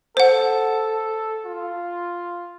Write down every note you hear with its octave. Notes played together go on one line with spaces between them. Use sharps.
A4 C5 F#5
F4